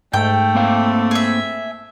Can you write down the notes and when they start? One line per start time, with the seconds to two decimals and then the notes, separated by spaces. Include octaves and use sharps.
0.14 G#2 A3 G5
0.55 A#3 C4 F5
1.11 G#4 E5